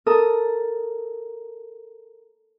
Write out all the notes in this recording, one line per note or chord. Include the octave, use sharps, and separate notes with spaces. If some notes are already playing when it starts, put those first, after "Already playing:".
A4 A#4 D#6